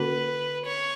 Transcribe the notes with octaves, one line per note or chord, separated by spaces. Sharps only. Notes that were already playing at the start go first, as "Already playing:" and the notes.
Already playing: D3 A#3 C#4 F#4 A#4 B4
C#5